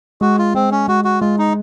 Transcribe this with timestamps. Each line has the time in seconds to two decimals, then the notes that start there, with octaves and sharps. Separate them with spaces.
0.21 G#3 F#4
0.39 F4
0.54 G#3 C4
0.71 C#4
0.88 G#3 F#4
1.05 F#4
1.21 G#3 F4
1.38 D#4